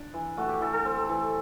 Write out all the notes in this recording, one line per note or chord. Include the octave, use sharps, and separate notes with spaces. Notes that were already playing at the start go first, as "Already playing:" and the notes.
Already playing: D4
E3
A3 F#4
G4
E3 A4
A4
C4 A4
E3